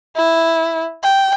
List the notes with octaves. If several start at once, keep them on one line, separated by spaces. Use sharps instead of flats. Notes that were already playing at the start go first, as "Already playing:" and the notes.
E4
G5